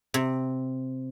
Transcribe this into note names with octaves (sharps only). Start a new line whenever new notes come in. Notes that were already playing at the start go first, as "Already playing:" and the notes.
C3